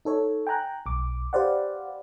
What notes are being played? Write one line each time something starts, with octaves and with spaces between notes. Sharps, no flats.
D#4 A4 C#5
G5 G#5 A#5 F#6
B1 D6
G4 B4 C5 D5 F5 F#5